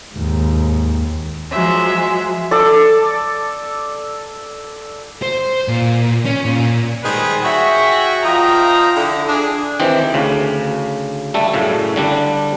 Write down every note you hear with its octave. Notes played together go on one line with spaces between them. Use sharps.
D#2 G#2
F3 F#3 G#3 E5
A4 D5
C5
A#2
C#4
A#2
D#3 G3 G#3 G#4 B4 C5
F#4 G#4 C#5 E5 F#5 G5
F3 F4 D#5 G5 A#5
D3 E4
D4 G#4
D#3 E3 C4 G4
D2 C#3
G3 A3 A4
F#2 A2 C#3
D3 G3 D4